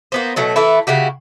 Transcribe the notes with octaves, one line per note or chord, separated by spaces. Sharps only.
A#3 B3 C5
B2 F#3 A3
E3 A3 E4
C#3 E4 F#4 G4